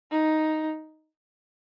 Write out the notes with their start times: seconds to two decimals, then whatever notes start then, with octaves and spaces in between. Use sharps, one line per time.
0.11 D#4